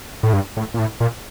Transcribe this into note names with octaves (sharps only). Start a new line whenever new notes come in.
A2
G2
A2
A#2
A2
A#2